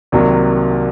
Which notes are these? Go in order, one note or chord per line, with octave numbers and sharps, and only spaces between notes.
C2 C3 D#3 F#3 A#3